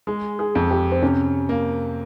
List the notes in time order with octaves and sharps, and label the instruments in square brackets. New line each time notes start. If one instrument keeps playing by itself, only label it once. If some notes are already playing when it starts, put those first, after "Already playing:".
[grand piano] G#3 [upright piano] G#4
[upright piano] G#4
[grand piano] F2
[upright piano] G4
C4
[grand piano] C3 [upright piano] C#4
[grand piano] A#3